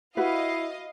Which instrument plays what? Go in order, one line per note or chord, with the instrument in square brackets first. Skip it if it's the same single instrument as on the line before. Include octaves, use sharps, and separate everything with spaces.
[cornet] E4 [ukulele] F#4 B4 [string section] D#5 F5